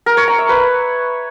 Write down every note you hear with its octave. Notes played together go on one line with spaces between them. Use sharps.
A#4
C#5
A#5
E5
B4